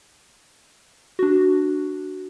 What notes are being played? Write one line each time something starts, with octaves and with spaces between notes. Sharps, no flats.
D4 F#4